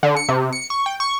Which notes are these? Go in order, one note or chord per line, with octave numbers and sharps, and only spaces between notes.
D3
C#7
C3
C#7
C#6
G5
C#6